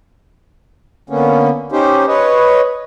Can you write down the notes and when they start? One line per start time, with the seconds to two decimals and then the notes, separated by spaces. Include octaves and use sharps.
1.10 D3 A#3 B3 C#4
1.72 C#4 D#4 G4 C5
2.08 B4 C#5 D#5